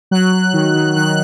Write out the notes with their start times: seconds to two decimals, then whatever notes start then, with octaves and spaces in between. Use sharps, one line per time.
0.11 F#3 F#6
0.32 F#3
0.53 D#3
0.75 D#3
0.96 D#3 F#6